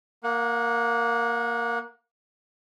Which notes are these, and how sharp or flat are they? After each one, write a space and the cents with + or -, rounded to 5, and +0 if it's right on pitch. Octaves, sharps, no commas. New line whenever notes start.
A#3 +0 F#5 -30